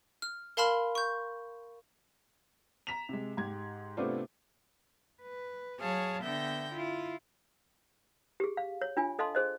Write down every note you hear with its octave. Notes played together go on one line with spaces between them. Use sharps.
F6
A#4 F5 A5 B5 C6 F6
C#6 G6
A#5 B6 E7 F7
C3 G#3
G#2 G4 G#6
C3 A3 B3 D4 F4 C5
B4
F#3 G#4 C#5 F5 A5
D3 B3 E5 G5 G6 A#6
E4 F4
G4 G#4
F5
C#5
D4 F4 G#5
A4 D#5 F5 A5 C6
G#4 C5 D#5